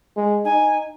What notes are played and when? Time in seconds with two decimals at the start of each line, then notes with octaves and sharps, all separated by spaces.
0.16 G#3
0.45 D#4 G#5